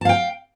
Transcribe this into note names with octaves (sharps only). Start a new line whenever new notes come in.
F5 G5 A5